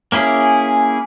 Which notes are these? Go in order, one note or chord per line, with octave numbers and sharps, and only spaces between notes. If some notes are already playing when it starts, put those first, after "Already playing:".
A#3 C#4 E4 G#4